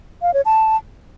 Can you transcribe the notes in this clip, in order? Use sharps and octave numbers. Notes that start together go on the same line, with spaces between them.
F5
C#5
A5